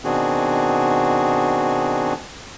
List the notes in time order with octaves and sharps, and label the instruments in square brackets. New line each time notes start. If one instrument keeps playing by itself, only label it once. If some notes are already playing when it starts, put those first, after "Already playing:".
[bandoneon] B2 D#3 C4 D4 F#4 G#4